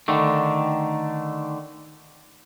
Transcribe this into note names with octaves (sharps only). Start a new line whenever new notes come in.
D3 D#3 A3